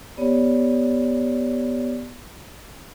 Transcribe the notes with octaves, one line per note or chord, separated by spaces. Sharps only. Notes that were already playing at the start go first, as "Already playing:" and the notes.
B3 G4 C#5 D5